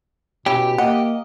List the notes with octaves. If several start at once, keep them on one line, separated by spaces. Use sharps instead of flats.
B2 C#4 E4 G4
A#3 D#5 F#5